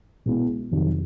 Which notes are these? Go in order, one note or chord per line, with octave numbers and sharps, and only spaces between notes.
B2 G#3 B3 E4
F2 C3 D#3 F#3